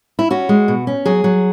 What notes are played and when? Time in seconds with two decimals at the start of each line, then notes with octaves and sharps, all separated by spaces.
0.19 E4
0.30 C#4 F#4
0.49 G#3
0.68 B2
0.87 C#4
1.05 F#3 G#4
1.24 F#3